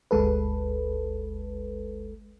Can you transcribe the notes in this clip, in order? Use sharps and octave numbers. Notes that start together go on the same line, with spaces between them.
G1 D2 G#3 A4 B4